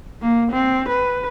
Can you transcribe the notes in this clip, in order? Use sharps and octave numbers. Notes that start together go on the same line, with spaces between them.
A#3
C4
B4